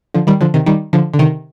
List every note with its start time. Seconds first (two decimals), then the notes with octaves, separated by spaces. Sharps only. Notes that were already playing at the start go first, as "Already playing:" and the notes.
0.14 D3 F3
0.27 D#3 G3
0.41 D3 F3
0.54 C3 D#3
0.66 D#3 G3
0.93 D3 F3
1.14 D3
1.19 C3 D#3